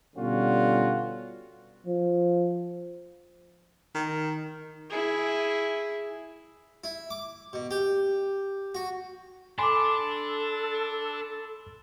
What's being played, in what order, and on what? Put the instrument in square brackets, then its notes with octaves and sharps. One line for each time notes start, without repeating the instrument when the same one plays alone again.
[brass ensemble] B2 D3 G3 C#4 F4 F#4
[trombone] F3
[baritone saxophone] D#3
[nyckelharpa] E4 G#4
[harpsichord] E4
D6
B2
G4
F#4
[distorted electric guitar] D4 [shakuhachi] A4 [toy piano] G#5 D6 [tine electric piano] B5 C6